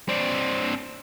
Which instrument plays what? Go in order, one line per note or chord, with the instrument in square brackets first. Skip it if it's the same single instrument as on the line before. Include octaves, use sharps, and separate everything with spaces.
[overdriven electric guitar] C4 D4